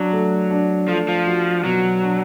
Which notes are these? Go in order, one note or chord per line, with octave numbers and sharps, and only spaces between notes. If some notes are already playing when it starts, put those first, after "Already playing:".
Already playing: F#3 D4
A3
D4
F3 A3
F3
F#4
B2 F#3
D4